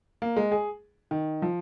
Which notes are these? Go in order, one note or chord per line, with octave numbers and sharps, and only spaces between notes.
A#3
G#3
G#4
D#3
F3